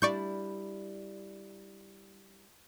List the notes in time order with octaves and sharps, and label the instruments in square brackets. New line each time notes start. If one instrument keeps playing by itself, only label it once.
[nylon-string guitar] G3 D4 E4 [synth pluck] D5 C#6 G6